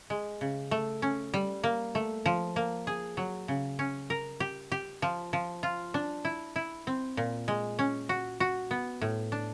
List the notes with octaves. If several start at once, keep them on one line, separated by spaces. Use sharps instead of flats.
G#3
C#3
A3
C#4
G3
A#3
A3
F3
A#3
G#4
F#3
C#3
C#4
A#4
G4
G4
F3
F3
F4
D4
E4
E4
C4
A#2
G#3
C#4
F#4
F#4
B3
A2
D4